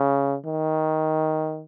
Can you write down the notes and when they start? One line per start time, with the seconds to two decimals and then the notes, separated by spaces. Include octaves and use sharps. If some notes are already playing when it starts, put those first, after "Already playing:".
Already playing: C#3
0.46 D#3